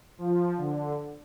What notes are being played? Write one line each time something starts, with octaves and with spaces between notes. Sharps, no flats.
F3
D3